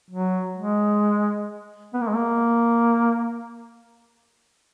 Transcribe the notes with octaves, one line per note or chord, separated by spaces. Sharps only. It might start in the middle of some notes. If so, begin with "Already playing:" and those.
F#3
G#3
B3
A#3
G#3
A#3